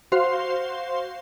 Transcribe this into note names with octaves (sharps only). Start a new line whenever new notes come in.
F#4 C5 F5 C6